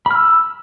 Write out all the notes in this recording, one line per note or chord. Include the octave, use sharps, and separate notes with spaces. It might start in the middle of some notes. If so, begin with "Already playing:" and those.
B5 E6 F6